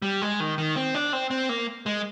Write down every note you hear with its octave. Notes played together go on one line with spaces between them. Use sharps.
G3
G#3
D#3
D#3
C4
D4
C4
C4
A#3
G#3